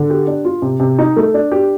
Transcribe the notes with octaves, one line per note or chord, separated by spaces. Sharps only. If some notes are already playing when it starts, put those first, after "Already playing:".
Already playing: D3
G4
D4
F4
C3
C3
D#4
A3
D4
G4